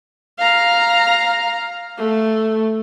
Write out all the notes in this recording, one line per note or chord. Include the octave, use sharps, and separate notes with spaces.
F5 A#5
A3